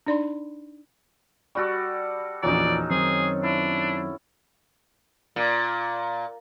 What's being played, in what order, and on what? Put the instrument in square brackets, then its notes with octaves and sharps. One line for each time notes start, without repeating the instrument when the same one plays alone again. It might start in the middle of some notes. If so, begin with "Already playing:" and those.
[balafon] D4 D#4 D5 B5 C6
[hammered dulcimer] G3 F#4 A4 [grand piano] C#6
[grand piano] A#1 E2 A#2 [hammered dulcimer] F#3 C#4 D#4 [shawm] D5
[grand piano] F#2 D#3 C4 [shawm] G#4
[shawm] D4 [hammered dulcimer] E4
[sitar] A#2